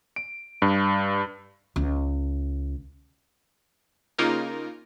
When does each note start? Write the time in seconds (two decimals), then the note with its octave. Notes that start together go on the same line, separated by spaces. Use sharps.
0.16 D7
0.62 G2
1.76 C#2
4.19 C#3 A#3 D#4 F4 A#4